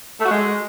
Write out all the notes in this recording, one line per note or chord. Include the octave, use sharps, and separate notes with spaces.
A3
F#4
G#3